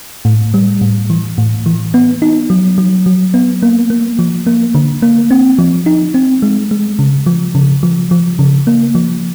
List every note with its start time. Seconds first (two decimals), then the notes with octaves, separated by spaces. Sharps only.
0.25 A2
0.54 G3
0.81 A2
1.10 E3
1.38 A2
1.66 E3
1.94 B3
2.22 D#4
2.50 F#3
2.78 F#3
3.06 F#3
3.34 B3
3.62 A#3
3.90 A#3
4.19 F3
4.47 A#3
4.75 D3
5.02 A#3
5.31 C4
5.58 F3
5.86 D#4
6.14 C4
6.42 G#3
6.71 G#3
6.99 C#3
7.26 F3
7.55 C#3
7.83 F3
8.11 F3
8.39 C#3
8.67 A#3
8.95 F3